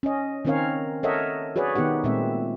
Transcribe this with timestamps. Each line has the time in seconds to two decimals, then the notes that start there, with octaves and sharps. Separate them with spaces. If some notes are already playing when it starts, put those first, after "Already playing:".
0.03 C#4 D#5
0.45 D#3 C4 C#4 A#4 C#5 F5
1.03 A4 A#4 C#5 D#5 E5 F#5
1.56 F#4 G#4 B4 C#5 D5
1.75 D#3 B3 D#4 G4 F#5
2.04 A#2 G#3 A3 B3 C4 E5